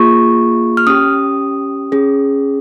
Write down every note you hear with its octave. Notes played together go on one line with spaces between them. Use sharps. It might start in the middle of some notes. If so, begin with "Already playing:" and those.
Already playing: A#3 F4 G#4 C#6
F6
C#4 G4 D#6
C#4 G#4